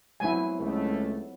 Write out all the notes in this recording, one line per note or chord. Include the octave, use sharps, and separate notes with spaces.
F#3 B3 C4 E4 G#5
C#2 A3